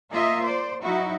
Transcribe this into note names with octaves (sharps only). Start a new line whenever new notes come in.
A#3 F4 D#5 E5
C5 D5
F#3 D#4 E4 F#4